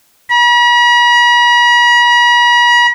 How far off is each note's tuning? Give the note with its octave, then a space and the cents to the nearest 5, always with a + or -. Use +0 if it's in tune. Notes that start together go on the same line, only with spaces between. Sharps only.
B5 -45